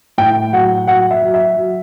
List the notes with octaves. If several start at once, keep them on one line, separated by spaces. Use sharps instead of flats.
A2 G5
F#3 F#5
F#3 F#5
E5
F#3
E5
F#3